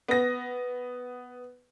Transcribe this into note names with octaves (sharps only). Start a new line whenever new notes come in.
B3 A#6